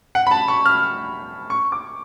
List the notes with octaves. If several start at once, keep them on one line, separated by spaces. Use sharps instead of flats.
F#5
B5
A5
C#6
F6
C#6
D6